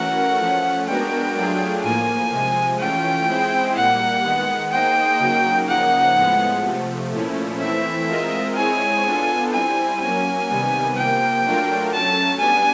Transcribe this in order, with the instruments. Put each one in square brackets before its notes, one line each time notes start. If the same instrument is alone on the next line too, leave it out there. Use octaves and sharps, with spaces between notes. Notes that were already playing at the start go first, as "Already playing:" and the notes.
Already playing: [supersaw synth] E3 A3 C#4 F#4 A#4 [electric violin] F#5
[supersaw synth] F3 A3 C#4
[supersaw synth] G#3 B3 D4 F#4 A#4 [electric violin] G5
[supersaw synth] F#3 A3 D4 F4 G#4
[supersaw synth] A2 F3 A#3 [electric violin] G#5
[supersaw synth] C3 F3 G#3
[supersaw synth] E3 A3 C#4 F4 [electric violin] G5
[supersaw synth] G#3 C4 E4 G#4 C5
[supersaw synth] A#2 G3 A#3 [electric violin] F#5
[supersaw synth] D#3 G#3 B3
[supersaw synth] A#3 D#4 G#4 C5 D#5 [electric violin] G5
[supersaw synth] C#3 F#3 A#3 D#4 F#4
[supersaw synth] C#3 F3 A#3 D#4 [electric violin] F#5
[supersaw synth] A2 F3 G#3 B3
C3 F3 A3
A#2 F3 A3 C#4 E4
[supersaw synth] E3 A3 C4 E4 [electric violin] E5
[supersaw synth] G#3 C4 F4 A#4 D#5
[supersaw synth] G#3 C4 E4 G#4 C#5 [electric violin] G#5
[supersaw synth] B3 D4 F4 A4
[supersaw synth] G3 C4 E4 [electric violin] G#5
[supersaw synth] F#3 A#3 C#4 [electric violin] G#5
[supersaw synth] C3 D#3 G3 B3
[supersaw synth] C3 F3 A#3 [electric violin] G5
[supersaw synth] F#3 A3 D4 F4 A#4
[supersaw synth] F#3 A3 C#4 [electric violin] A5
[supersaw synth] G3 B3 D4 [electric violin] G#5